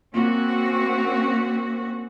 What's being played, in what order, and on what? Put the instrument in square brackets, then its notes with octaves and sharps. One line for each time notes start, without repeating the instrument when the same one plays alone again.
[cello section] A#3 C4 C#4 F#4